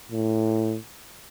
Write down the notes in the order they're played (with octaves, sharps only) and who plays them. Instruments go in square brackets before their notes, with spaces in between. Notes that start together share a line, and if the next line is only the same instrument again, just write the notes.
[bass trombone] A2